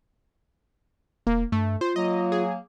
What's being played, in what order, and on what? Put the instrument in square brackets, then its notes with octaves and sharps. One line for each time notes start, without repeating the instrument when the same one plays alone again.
[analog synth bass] E1 [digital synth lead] A#3
[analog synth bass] G2 [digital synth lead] A3
[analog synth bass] F4 [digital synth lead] C5
[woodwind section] F#3 A#3 [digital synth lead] D#5
[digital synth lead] G#4